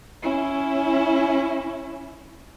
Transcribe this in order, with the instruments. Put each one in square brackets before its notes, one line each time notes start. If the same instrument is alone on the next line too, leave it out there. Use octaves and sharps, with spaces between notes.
[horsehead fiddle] C#4 E4